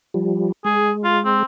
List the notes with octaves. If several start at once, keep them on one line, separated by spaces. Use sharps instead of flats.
F3 G3
G#3 G#4
F4
C4